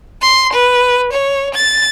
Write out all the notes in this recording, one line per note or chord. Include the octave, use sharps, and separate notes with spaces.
C6
B4
C#5
A6